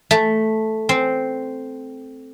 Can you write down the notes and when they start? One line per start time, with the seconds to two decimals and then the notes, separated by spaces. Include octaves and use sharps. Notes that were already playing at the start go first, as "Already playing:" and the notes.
0.11 A3
0.89 C4